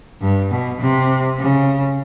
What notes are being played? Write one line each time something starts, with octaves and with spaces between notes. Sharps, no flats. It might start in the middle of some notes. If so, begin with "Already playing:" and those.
G2
B2
C3
C#3